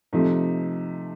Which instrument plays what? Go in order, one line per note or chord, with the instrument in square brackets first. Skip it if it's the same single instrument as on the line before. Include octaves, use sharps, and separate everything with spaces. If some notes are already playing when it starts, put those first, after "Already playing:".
[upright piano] C3 F3 A3 D#4